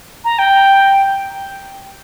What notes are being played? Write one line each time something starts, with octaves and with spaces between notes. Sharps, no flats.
A#5
G5